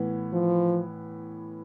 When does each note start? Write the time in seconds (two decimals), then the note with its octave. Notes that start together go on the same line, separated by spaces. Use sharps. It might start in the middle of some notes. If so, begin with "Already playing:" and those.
Already playing: A2 E3 B3
0.33 F3